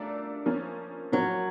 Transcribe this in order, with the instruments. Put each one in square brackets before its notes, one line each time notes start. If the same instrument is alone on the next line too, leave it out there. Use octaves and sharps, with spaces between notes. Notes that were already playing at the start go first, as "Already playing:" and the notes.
Already playing: [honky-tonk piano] A3 D4 F4 A#4 D5
F3 A#3 C#4
[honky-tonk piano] F3 A#3 C#4 [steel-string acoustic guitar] F#3